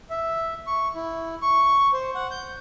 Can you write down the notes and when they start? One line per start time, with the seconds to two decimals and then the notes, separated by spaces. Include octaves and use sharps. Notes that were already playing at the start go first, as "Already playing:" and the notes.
0.10 E5
0.67 C#6
0.95 E4
1.42 C#6
1.93 C5
2.15 F#5
2.31 G6